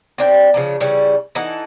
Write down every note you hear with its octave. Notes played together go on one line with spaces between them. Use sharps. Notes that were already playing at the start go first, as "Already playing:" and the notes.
C4 D4 G5
C#3 F3 D4
C#3 E3 G3 C#4
E3 D#4 A4 F#5